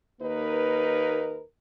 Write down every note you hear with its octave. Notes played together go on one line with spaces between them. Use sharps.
D#2 A#3 D#4 A#4 B4